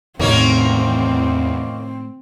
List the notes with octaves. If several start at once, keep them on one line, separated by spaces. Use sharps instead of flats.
E2 A2 C3 D#3 A#3 C4 C#4 D#4